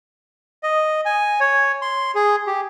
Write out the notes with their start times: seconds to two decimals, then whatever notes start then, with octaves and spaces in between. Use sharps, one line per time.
0.63 D#5
1.05 G#5
1.40 C#5
1.82 C6
2.15 G#4
2.47 G4